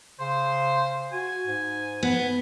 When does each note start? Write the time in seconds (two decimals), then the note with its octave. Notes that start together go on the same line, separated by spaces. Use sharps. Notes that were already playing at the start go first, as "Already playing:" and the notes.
0.19 C#3 C5
1.13 F#4 G#5
1.46 G#2
2.03 B3